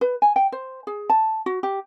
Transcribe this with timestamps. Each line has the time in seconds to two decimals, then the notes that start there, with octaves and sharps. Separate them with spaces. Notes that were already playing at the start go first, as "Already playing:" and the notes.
0.01 B4
0.22 G#5
0.36 G5
0.52 C5
0.87 G#4
1.10 A5
1.46 F#4
1.63 G4